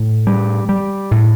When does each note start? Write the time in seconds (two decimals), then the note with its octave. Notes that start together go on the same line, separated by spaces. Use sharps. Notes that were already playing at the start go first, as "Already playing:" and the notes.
Already playing: A2
0.27 G3
0.69 G3
1.11 A2